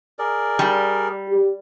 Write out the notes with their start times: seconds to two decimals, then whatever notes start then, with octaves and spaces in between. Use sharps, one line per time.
0.19 G#4 A#4 D5
0.59 G3
1.29 G4